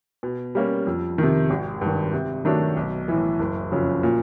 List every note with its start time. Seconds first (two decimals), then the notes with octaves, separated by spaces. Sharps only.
0.23 B2
0.55 G3 A#3 C#4
0.87 F2
1.18 C3 D#3
1.50 G#1
1.81 G2 D#3
2.13 C3
2.45 D#3 F#3 A3 D4
2.77 B1
3.08 A2 E3
3.39 F#1
3.71 F2 C#3 F#3
4.03 A#2